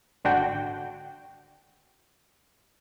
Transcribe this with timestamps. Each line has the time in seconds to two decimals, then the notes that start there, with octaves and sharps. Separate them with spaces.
0.25 G#1 D3 D4 F#4 G5